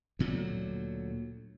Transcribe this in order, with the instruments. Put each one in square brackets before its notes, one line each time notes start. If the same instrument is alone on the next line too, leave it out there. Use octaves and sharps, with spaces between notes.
[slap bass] D2 A#2 F#3